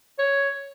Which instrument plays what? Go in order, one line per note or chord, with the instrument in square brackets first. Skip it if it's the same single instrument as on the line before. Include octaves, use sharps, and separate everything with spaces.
[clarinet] C#5